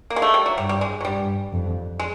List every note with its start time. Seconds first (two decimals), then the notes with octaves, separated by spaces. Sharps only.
0.10 A#3
0.16 G#3
0.22 A3
0.34 G3
0.46 F#3
0.58 G2 G3
0.69 G3
0.81 G#3
1.01 F#3
1.05 G2 G3
1.53 F2
1.99 G#3